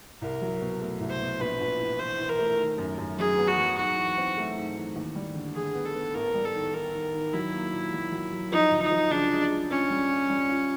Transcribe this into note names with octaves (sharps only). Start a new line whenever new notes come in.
C2 A#4
F#3
B2
A3
C2
C5
B2
A#1 B4
A#1
A2
E3 C5
E3
A#4
A3
D#3
F#2
F#2
F#3 G#4
B3
F#4
F#3
G#2 F#4
E3
C4
A3
G#2
E3
D#2
G3
D3
D3 G#4
B3
A4
B3
A1 A#4
G3
A4
D#3
D#3 A#4
D#3
D#3
F#3 E4
A#3
A#2
F#3
F#3
F#3
F3 D#4
D2
D#4
F3
C#3 D4
G#3
G#3
A#2 C#4
G3
F4
G3
F4